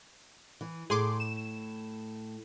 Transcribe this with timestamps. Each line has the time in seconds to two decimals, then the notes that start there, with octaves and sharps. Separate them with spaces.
0.61 E3
0.90 A2 G#4 C6 D6
1.20 E7